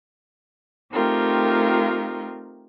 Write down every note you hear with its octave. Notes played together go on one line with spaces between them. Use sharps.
A3 C4 D#4 F4 G4 A#4